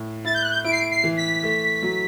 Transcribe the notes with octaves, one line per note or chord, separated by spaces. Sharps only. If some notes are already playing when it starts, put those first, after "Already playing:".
Already playing: A2
E4 A6
G6
F#6
G6
E4 D7
C7
D7
C7
E3
B6
A3
F#3